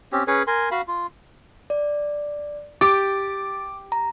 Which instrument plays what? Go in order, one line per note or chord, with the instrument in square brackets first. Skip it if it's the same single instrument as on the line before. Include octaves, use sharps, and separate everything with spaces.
[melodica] C4 C#4 G4
C#4 G#4 B4 C#5
A#4 G#5 C6
F#4 F5 B5
F4
[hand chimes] D5
[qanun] G4 [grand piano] D6 [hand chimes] A6 D7
[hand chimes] A#5